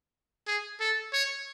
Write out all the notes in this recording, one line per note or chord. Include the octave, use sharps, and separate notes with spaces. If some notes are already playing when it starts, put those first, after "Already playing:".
G#4
A4
C#5